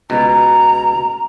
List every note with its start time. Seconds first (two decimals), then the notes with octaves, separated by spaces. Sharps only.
0.10 C#2 B2 A#5